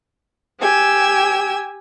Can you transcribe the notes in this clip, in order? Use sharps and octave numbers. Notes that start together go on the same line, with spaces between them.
G4 G#5 E6